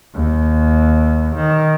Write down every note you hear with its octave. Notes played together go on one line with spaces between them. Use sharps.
D#2
D#3